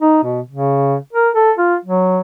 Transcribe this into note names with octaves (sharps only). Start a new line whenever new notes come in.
D#4
B2
C#3
A#4
A4
F4
F#3